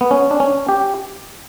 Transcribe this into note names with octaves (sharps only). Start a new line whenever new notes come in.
B3
C#4
D4
C#4
G4